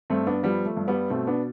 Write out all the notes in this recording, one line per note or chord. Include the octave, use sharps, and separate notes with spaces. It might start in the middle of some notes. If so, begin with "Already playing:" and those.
G2 A3 C4
B3 D4
F3 G3 B3
A3
G2
G3 B3
B2 A3 C4
B3 D4